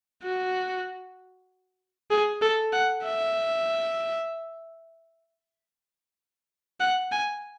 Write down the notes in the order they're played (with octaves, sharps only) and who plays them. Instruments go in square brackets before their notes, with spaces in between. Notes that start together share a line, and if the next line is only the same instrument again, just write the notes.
[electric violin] F#4
G#4
A4
F#5
E5
F#5
G#5